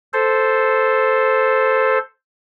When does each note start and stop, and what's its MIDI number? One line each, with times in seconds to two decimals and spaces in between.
0.13 1.98 69
0.13 1.98 72